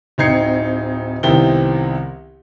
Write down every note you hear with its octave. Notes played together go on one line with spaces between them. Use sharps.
D1 C4 D#4 G#6 C7 C#7
C2 D#3 B3 C4 E4 G7